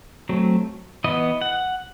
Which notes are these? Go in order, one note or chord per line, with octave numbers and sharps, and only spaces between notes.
F#3 A3 C4
E3 B3 D#5
F#5